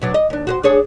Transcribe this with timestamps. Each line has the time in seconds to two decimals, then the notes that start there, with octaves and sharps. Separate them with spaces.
0.02 B2 F#3 D4
0.14 D#5
0.30 D#2 D4
0.47 F#4 G#4 C5
0.64 D4 G#4 C#5